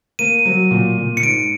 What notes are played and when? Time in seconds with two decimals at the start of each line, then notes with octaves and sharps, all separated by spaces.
0.19 A#3 D#7
0.45 F#3
0.71 A#2
0.98 A#2
1.17 C#7
1.23 G#2 D7